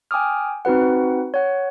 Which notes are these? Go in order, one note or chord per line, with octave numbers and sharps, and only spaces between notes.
G5 G#5 D6 D#6 F6
C4 D#4 F#4 B4 F#5
C#5 F#5